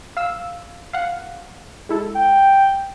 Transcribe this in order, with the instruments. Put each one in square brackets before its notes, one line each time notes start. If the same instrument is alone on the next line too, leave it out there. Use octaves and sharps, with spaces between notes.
[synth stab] F5 E6
F5 F#5
G#3 E4 A4
[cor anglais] G5